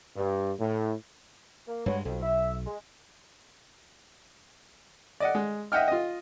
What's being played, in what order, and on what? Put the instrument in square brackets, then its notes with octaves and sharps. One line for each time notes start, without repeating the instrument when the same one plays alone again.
[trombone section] G2
A2
[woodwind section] A#3
[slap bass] G2 G3 G#3 [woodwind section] F#4 B4 C#5
[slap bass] B1 [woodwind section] F2
[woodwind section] E5
G#3
[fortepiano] D5 D#5 F#5
G#3
D#5 E5 F#5 G5 F6
F4 D#5